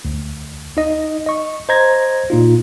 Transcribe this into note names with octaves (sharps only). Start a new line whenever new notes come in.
D2
D#4 D#5
D#5 C#6
C5 D#5 A#5 G#6 A#6
A#2 D#4 F4